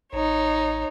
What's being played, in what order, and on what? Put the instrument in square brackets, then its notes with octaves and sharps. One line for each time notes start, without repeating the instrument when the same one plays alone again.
[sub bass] A1 [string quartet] D#4 C#5